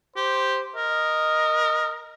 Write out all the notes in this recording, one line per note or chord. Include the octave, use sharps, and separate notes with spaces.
G4 C5
A#4 D#5